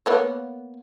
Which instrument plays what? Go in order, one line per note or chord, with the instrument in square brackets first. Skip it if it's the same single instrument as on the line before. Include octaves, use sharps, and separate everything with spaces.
[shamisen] A#3 B3 C#5